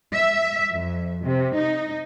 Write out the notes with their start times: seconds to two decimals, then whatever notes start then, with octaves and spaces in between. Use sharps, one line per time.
0.13 E5
0.72 F2
1.23 C3
1.56 D#4